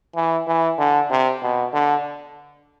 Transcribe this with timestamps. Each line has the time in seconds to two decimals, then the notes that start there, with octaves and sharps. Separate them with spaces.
0.16 E3
0.47 E3
0.79 D3
1.10 C3
1.43 B2
1.74 D3